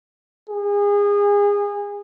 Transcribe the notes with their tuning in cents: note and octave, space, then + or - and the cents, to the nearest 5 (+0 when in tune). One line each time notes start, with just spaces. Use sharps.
G#4 -30